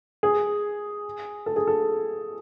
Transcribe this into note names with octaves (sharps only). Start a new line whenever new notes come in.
G#4
A4
G#4
A4